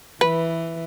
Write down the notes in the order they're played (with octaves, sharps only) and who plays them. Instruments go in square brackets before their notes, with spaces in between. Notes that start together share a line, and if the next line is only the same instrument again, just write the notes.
[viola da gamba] E3 [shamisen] B4